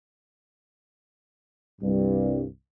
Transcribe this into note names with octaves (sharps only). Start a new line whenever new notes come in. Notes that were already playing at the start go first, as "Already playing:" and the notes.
C2 G2